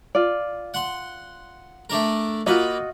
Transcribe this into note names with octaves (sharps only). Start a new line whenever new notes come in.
F4 D5
F#5 C6
A3 D4 A#4
A#3 F4 F#4 D#5 B5